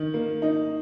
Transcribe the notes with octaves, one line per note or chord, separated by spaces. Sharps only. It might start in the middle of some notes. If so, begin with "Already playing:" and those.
Already playing: D#3
A#3
D#4